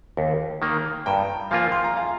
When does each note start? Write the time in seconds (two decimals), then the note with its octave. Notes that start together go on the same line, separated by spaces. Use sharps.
0.17 D#2
0.62 D#3 A#3
1.06 G2 G5 A#5
1.51 F3 A#3 F4 F5 G#5
1.72 C6
1.84 A#5
1.96 F5 G#5